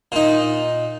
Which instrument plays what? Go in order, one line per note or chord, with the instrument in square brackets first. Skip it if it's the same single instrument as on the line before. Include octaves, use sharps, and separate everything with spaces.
[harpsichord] A#2 D#4